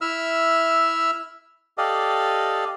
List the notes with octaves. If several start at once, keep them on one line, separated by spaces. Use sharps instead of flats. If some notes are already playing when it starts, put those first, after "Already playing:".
E4 E5 E6 F6
G4 A4 D5 D#5 F5